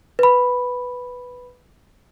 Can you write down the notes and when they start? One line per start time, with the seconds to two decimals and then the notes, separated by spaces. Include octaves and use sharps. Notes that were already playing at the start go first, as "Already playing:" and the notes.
0.19 B4 B5